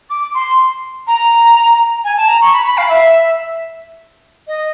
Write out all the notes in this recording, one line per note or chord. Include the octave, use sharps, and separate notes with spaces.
D6
C6
A#5
G#5
A5
A#5
C#6
B5
B5
F5
E5
D#5